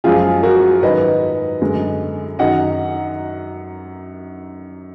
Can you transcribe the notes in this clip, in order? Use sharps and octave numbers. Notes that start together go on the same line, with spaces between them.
F#2 F3 G#3 F4 G#4
F#4 A#4
G#2 D#3 F#3 B4 D#5
F#2 D3 G#3
F#2 D#3 F#3 D#5 F#5